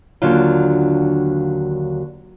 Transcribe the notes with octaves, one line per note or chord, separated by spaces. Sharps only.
D#2 D3 F#3 C#4 D4 F4